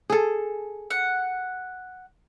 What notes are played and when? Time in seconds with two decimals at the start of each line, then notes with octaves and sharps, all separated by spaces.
0.10 G#4 A4
0.90 F#5